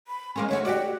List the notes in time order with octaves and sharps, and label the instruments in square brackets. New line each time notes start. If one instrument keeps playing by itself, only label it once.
[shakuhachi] B5
[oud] G#3 A#3 C#4 [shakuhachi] C6
[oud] D2 A3 F#4 [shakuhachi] C#5
[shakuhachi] F#4 [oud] G4 D5